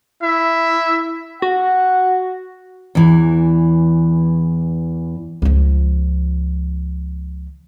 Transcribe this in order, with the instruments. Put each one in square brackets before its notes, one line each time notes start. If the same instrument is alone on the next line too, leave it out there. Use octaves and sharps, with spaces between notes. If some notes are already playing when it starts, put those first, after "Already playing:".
[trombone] E4 [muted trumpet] E5
[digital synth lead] F#4 [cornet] F#5
[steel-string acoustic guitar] E2 E3
[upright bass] C#2 F3